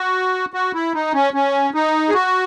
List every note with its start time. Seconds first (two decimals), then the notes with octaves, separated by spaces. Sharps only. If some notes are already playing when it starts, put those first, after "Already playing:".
Already playing: F#4
0.54 F#4
0.75 E4
0.95 D#4
1.14 C#4
1.34 C#4
1.74 D#4
2.09 G#4
2.14 F#4